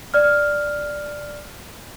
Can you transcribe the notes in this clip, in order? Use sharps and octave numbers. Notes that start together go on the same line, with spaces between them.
D5 F6